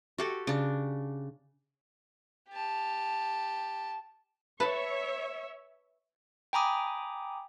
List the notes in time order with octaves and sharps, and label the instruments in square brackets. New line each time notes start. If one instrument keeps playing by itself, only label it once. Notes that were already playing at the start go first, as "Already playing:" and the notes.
[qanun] F#4 G4 A4
C#3 D4
[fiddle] G4 A5
[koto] B4 A5 [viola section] C#5 E5
[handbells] G5 G#5 A#5 B5 D6 D#6